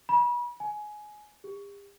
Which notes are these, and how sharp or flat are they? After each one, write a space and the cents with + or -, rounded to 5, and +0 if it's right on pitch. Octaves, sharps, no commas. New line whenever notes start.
B5 -35
G#5 +15
G4 +45